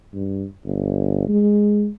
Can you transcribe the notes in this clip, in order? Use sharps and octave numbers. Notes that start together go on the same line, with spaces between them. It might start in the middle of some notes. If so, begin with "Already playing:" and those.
G2
G1
G#3